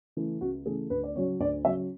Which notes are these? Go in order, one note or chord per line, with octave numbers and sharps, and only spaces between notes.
C#3 E3 A3
C#2 F#4
C#3 E3 A3 G#4
D2 B4
D5
C#3 F#3 C#4 C#5
D2 D5
C#3 F#3 C#4 E5